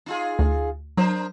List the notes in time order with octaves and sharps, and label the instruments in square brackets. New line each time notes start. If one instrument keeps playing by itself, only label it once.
[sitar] D#4 F4 G#4
[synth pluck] D2
[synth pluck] F#3 [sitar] D4 A#4 C5